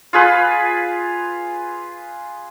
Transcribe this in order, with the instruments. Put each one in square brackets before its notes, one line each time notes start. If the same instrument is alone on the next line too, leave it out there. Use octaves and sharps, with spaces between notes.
[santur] F4 G#4 B4